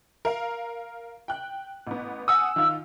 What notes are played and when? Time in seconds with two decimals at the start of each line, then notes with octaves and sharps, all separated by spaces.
0.25 A#4 F5
1.28 G5 F#6
1.87 A1 B3
2.28 F#5 G#5 D#6 E6
2.56 D#3 F4